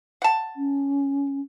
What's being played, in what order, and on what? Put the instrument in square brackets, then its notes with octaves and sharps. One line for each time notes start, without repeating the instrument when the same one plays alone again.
[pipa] F#5 A5
[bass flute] C#4